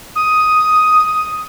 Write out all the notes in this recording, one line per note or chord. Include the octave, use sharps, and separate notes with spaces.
D#6